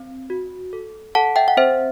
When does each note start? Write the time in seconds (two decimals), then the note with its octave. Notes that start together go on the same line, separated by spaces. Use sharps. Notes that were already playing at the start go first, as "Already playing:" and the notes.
Already playing: C4
0.30 F#4
0.73 A4
1.15 A4 F#5 A5
1.36 E5 G5
1.48 F#5
1.57 C4 C5 E5